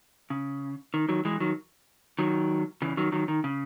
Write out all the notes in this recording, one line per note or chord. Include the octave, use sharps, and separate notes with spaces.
C#3
D#3
D#3 F#3
E3 G#3
D#3 F#3
D#3 F#3
C#3 E3
D#3 F#3
D#3 F#3
D#3
C#3